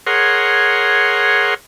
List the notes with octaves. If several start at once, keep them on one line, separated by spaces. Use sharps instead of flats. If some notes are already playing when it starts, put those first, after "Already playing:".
G#4 A#4 C#5 F#5 C6